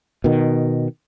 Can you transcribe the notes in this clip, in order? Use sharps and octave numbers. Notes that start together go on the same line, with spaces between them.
B2 D#3